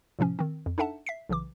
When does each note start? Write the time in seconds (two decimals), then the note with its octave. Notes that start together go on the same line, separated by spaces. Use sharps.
0.19 A2 C3 F3 C#4
0.39 D#3 C4
0.66 F2
0.78 D4 D#4 A4 E5 F#5 A5
1.07 E5 B6 C7
1.29 B1 C#3 E3 D6